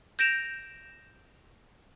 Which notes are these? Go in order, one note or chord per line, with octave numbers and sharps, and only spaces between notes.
G6 A#6 D7 E7 F7